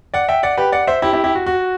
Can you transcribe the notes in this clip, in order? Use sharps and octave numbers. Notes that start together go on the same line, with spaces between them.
D5 F#5
E5 G5
D5 F#5
G4 B4
D5 F#5
C5 E5
E4 G4
E4 G4
E4 G4
F#4
F#4